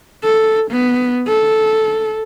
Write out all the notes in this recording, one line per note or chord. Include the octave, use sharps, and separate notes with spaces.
A4
B3
A4